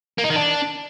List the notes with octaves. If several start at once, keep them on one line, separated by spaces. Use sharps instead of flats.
A#3
D#4
D#3
D4